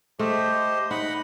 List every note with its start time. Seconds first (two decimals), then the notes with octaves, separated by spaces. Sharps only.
0.19 A3 G4 C5 D#5
0.91 D#4 D#5 F#5 B5